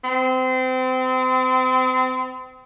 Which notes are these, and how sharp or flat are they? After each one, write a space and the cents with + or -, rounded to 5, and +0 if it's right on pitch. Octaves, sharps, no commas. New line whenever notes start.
C4 -30